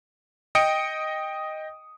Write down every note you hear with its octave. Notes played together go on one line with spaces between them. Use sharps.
D#5 G5 D#6 C#7 D7